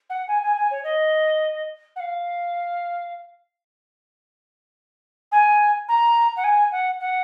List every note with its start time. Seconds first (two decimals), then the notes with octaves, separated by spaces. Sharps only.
0.09 F#5
0.28 G#5
0.42 G#5
0.57 G#5
0.71 C#5
0.84 D#5
1.96 F#5
2.00 F5
5.31 G#5
5.88 A#5
6.36 F#5
6.44 G#5
6.71 F#5
7.00 F#5